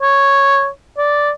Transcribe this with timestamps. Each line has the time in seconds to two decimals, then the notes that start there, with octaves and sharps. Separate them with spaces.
0.02 C#5
0.98 D5